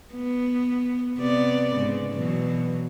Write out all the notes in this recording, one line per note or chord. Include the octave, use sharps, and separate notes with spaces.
B3
C3 B3 D5
G#2 C#3
B2 E3 F#3